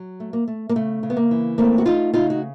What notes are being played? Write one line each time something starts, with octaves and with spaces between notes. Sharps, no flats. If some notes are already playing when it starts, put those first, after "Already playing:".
Already playing: F#3
A3
A#3
A3
A#3
C#3 A3
C#3
B3
A#3
E3
A3 A#3 C4
F#4
A3 D#4 F4
C#3 D#4 F4
F#4